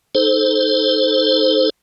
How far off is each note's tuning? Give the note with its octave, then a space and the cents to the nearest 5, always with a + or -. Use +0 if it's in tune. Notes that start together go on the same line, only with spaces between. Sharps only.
D#4 +5 A4 -20 C5 +0